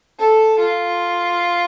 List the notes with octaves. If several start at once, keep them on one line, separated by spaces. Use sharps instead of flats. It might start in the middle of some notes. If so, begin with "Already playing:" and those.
A4
F4